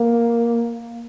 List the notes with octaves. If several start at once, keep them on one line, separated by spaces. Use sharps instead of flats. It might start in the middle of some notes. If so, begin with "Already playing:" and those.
Already playing: A#3